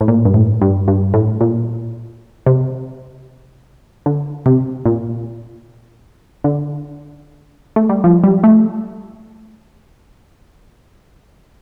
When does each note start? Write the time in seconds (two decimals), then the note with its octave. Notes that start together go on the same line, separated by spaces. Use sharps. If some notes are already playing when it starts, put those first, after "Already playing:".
0.01 A2
0.08 A#2
0.25 G2
0.34 A2
0.62 G2
0.88 G2
1.14 A2
1.41 A#2
2.47 C3
4.06 D3
4.46 C3
4.86 A#2
6.44 D3
7.76 A3
7.89 G3
8.04 F3
8.24 G3
8.44 A3